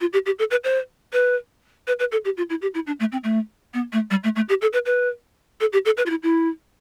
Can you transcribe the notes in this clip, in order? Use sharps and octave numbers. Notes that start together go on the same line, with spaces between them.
F4
G4
G4
A4
B4
C5
B4
B4
B4
A4
G4
F4
E4
G4
E4
D4
A3
C4
A3
B3
A3
G3
A3
A3
G4
A4
B4
B4
A4
G4
A4
B4
F4
E4
E4